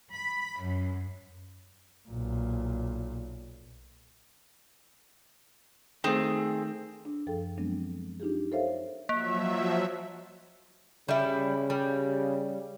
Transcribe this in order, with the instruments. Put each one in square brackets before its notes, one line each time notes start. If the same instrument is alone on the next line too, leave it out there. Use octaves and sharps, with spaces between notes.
[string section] B5
F#2
[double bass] B1 A#2
[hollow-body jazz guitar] D#3 A3 [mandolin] C4 G#4
[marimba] D4
F#2 F3 G#4 A4 G5
F3 F#3 G#3 B3 C4 D4
D4 D#4 F4 G4 G#4
A4 A#4 C5 C#5 E5 F5
[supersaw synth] F3 F#3 E5 [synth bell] A#3
[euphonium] C#3 [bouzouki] G3 E4
[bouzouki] G3